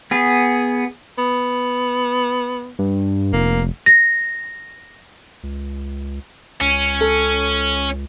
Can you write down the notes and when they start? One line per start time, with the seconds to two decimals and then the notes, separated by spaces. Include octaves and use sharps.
0.11 B3 G#4
1.18 B3
2.79 G2
3.33 F1 A#3
3.86 A#6
5.43 C#2
6.61 C#2 C#4
7.01 A4